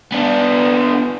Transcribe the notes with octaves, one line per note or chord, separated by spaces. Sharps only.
B3 D4